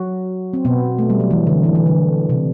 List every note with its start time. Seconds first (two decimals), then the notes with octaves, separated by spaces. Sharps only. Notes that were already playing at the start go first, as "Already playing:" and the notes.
Already playing: F#3 F#4
0.53 C4
0.65 B2 B3
0.99 A3
1.10 G3
1.20 F#3
1.31 E3
1.47 D3
1.64 E3
1.75 E3
1.86 D3
2.29 C3